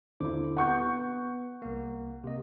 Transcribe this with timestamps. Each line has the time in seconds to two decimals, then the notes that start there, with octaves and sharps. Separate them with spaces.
0.20 D#2 D3 E4 C5 D6
0.57 B3 F#5 C#6 G6
1.62 C2 A#3
2.24 C3 A#3 D#5